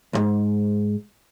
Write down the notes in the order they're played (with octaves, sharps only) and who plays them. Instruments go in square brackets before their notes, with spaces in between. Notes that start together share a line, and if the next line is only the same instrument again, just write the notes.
[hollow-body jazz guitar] C2 G#2